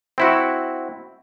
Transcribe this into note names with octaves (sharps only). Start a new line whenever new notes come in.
C4 E4 F#4